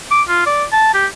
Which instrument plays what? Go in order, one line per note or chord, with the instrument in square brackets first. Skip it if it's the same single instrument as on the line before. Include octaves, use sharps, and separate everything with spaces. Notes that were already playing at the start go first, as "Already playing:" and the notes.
[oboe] D6
F4
D5
A5
G4